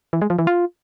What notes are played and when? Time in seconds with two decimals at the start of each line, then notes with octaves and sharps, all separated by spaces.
0.13 E3
0.22 G#3
0.30 F3
0.39 E3
0.47 F4